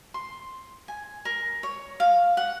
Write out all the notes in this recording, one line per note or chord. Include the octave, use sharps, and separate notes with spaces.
C6
G#5
A#4
C#5
F5
F#5